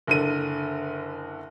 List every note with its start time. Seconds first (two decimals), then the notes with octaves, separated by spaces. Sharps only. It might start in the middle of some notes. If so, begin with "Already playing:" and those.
0.07 F#1 D3 D#7